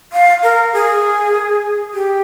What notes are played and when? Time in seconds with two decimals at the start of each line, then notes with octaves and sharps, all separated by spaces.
0.13 F5
0.43 A#4
0.73 G#4
1.94 G4